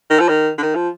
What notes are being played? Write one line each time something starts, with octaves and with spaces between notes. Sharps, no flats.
D#3
F3
D#3
D3
D#3
F3